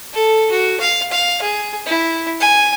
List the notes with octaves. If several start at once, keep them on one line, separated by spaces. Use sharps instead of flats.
A4
F#4
F5
F5
G#4
E4
G#5